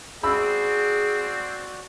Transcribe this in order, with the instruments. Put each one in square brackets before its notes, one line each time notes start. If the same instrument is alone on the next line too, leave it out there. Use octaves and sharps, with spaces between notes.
[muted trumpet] C4 [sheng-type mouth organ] F#4 D5 [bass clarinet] G#4 [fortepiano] B5 E6